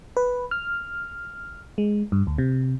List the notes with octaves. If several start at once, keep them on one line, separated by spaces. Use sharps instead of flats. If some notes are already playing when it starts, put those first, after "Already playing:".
B4
F6
G#3
G2
D2
C3